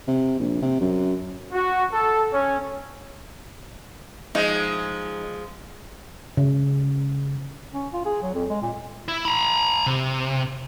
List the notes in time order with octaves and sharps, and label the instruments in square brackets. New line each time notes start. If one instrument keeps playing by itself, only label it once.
[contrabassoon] C3
A#1
C3
F#2
[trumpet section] F#4
A4
C#4
[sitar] F3 G#3 [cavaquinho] D#4
[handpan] C#3
[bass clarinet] C#4
F4
G#4
F#3
F2
G#3
A#2
[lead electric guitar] E4
A#5 B5
C3